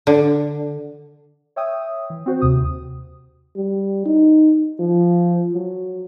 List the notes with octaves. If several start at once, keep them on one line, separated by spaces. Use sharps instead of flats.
D3
C#5 E5 G5 D#6
E3
C4 F#4 C5
D#2 C3 D#6
G3
D#4
F3
F#3